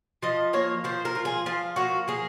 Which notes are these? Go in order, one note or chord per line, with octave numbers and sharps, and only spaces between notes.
F3 D#5
A#3 C#5
F3 C5
A#4
F4
G#4
F3 F4
A#3 F#4
A#3 G#4